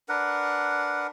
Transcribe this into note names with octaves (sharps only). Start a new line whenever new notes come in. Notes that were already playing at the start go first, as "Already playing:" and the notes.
D4 A#4 B4 F#5